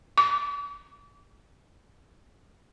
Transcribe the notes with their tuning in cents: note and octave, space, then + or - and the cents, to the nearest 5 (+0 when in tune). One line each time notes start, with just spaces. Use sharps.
D6 -40